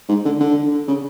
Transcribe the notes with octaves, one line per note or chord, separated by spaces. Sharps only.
G#2
D3
D3
C#3